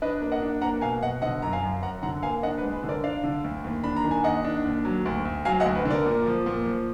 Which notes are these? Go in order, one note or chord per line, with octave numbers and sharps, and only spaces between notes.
D4 B4 D#5
A#3
D#5 F#5
D4
A#3 F#5 A#5
B2 F5 G#5
B2 D#5 F#5
D3 D#5 F#5
F#2 A#5
F5 G#5
F#2
F#2 F#5 A#5
D3 F#5 A#5
A#3 F5 G#5
D4 D#5 F#5
B4
G#3
B4
D3
A#4 D5
D4 D5 F5
D3
D2
D#2
D4 B5
A#5
D#3
G#5
D#2 D#5 F#5
D4
D#2
F#3
D2
D2
F#3 F5 G#5
D#5 F#5
D2
B4
D3
A#4 D5
A#2
F3
A#2
F3